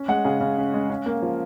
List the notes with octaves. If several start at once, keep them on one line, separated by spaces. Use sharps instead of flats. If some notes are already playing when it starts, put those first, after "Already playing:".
Already playing: C#4
G#3 F#5
C#3 G#4
C#3
C#4
G#3
C#4
A#3
F3